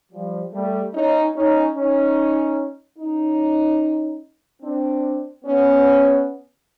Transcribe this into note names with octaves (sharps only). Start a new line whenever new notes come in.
F3 G3
G3 A3
C#4 D#4
C#4 D#4
C#4 D#4
C#4 D#4
C4 D4
B3 C#4